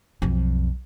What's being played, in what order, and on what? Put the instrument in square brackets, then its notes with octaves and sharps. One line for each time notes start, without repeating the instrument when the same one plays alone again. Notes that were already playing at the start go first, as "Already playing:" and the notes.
[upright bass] B1 F2